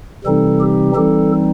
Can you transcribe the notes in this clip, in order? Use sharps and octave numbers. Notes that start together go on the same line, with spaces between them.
C3 E3 G3 C4 D#4 A4
G4
E3 G3 C4 D#4 A4